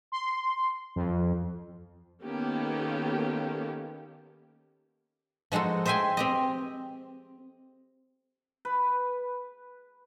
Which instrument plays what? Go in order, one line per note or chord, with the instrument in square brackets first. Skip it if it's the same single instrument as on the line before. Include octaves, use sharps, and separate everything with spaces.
[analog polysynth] C6
F2
[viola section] D#3 A#3 B3 C#4 G4 A4
[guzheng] F3 G#3 D#4 F#4 A4
C5 D#5 E5 G5 G#5 C6
C4 G4 D#5
[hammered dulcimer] B4